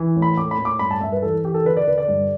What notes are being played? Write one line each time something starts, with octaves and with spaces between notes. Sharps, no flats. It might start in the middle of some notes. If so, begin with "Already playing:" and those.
Already playing: E3
A2
B5
A2 D6
B5
A2
D6
G2 B5
A5
G2 E5
B4
E3 A4
E3 G4
A4
D3 B4
D5
D3 B4
D5
G2